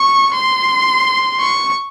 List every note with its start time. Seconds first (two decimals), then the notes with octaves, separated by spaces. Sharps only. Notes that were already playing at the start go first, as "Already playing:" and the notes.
Already playing: C#6
0.34 C6
1.40 C#6